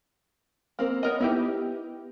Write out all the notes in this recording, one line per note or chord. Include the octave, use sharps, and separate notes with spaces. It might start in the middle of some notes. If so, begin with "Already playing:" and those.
A#3 C4 A#4
B3 A#4 C#5 D#5
B3 D#4 E4 G4